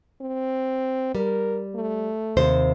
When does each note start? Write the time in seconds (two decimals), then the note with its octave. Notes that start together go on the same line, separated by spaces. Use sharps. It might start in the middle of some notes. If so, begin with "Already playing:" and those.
0.21 C4
1.15 G3 A#4
1.75 A3
2.37 D#2 C3 C5